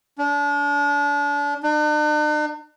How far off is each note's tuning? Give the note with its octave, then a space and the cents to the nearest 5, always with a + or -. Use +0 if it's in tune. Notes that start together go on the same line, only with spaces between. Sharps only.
D4 -35
D4 +45